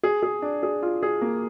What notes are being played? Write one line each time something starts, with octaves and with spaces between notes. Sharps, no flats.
G#4
G#4
D4
G#4
F4
G#4
A#3